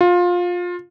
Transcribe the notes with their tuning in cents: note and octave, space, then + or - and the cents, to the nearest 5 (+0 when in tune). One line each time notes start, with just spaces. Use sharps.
F4 +20